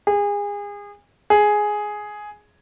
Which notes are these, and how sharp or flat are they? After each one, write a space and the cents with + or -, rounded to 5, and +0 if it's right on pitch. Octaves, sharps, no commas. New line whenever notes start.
G#4 -30
G#4 +5